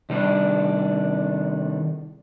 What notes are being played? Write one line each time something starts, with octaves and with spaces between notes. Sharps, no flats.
C3 D#3 G3 D4